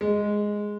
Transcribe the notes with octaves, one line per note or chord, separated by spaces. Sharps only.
G#3